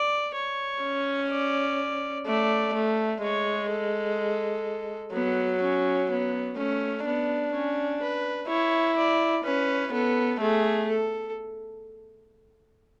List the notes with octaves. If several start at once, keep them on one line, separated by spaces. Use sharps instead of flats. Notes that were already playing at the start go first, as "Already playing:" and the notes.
Already playing: D5
C#5
C#4
D5
A3 D5
A3
G#3 C#5
A4
F#3 B3
C#4
B3
A3 C#4
B3 D4
C#4
B4
E4 C#5
D5
C#4 B4
B3 A4
A3 G#4
A4